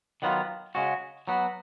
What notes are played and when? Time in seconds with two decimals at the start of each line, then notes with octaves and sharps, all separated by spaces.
0.22 D#3 F#3 B3 F4
0.75 C#3 G#3 C#4 F#4
1.28 F#3 B3 F#4